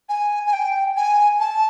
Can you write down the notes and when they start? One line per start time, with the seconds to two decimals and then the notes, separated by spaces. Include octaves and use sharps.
0.09 G#5
0.47 G#5
0.53 G5
0.97 G#5
1.40 A5